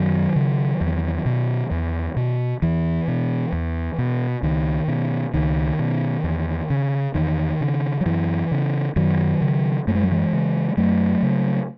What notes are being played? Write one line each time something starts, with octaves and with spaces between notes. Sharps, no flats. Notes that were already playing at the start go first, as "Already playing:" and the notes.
Already playing: F#2 D#3 F#3
C#3
E2
B2
E2
B2
E2 E3
B2
E2
B2
C#2 D#3
B2
C#2 D#3
B2
E2
C#3
E2 D#3
C#3
F#3
F#2 E3
C#3
F#2 D#3 F#3
C#3
F#2 A3
G#3
F#3
E3 G#3
C#3
F#2 F#3 A3
C#3